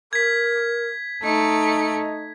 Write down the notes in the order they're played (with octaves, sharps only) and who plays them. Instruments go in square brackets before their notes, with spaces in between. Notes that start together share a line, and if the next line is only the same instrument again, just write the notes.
[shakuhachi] A#4 [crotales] G#6 B6
[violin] A3 C#7 [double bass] D#4 [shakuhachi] D#5